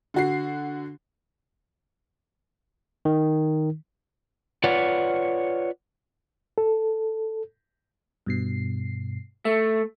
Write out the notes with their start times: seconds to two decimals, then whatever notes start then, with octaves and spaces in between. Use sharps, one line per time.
0.14 D3 F#4 C7
3.05 D#3
4.64 F4 B4 C#5 D5 F#5
6.58 A4
8.26 G2 B2 C7
9.45 A3 E5